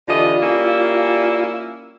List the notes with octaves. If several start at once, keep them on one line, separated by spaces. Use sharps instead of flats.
D3 E3 G3 F4 D#5
A#3 C#4 E4